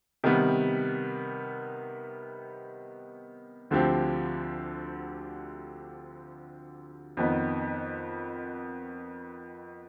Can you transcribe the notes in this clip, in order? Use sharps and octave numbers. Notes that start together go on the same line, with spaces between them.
C3 D#3 G3 B3
D2 D3 F3 C4 G4
F2 D#3 B3 D#4